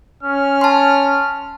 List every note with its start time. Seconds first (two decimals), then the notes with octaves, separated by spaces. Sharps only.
0.23 C#4 F6
0.61 A5 C6